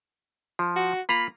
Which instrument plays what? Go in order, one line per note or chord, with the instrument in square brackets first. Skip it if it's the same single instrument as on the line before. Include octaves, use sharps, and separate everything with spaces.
[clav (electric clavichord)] F3
[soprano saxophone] F#4
[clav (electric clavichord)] A#3 F4 A#5 [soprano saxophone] B5